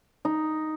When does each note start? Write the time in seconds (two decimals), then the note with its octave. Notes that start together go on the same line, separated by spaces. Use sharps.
0.25 D#4